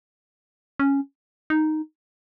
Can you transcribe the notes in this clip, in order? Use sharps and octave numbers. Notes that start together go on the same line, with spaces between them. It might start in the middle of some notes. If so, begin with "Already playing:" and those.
C#4
D#4